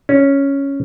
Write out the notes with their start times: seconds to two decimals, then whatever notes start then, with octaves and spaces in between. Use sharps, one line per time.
0.09 C#4